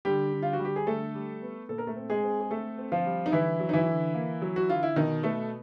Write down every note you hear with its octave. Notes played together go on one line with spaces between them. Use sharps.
D3 G3 G4
D3
F4
F#4
G3
G4
G#4
D3 A3 A4
G3
B3
A#2 A4
A#4
A3 A4
C4
G#3 G#4
C4
G#4
A3 C4 A4
C4
F3 F4
G3
D#4
D3 E3 E4
F#3
D#4
E3 E4
D3
A#3
F#3
F#4
D3 F4
E4
B2 D#3 D#4
A3 B3 A4